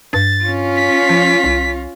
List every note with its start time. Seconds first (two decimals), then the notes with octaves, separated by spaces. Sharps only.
0.13 G2 A6
0.44 C#4 F4
0.76 B6
1.09 F3
1.44 C2